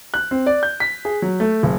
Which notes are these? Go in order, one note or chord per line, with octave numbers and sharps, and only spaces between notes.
F#6
C4
D5
G6
B6
G#4
F#3
A3
F#1